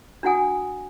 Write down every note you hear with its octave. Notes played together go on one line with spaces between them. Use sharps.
D4 E4 F#4 F#5 G#5 D#6